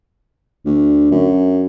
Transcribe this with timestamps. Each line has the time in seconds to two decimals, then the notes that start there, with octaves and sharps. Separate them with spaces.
0.65 D2
1.11 F#2